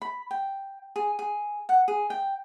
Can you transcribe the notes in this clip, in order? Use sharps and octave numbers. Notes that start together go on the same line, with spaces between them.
B5
G5
G#4
G#4
F#5
G#4
G5